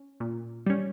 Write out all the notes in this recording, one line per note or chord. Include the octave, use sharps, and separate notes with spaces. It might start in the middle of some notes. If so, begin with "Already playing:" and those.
Already playing: C#4
A#2
G3 C#4